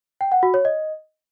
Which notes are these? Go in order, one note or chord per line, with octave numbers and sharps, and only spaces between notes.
G5
F#5
F#4
C#5
D#5